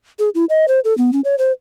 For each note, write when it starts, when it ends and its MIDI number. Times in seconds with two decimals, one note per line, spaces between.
0.19 0.29 68
0.35 0.45 64
0.49 0.66 75
0.68 0.80 72
0.85 0.96 69
0.98 1.11 59
1.13 1.21 61
1.24 1.35 73
1.38 1.52 72